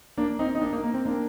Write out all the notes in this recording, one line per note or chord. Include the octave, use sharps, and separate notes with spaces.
A#3 D4
C4 D#4
D#4
A#3 D4
A#3
A#3
C4
A#3 D4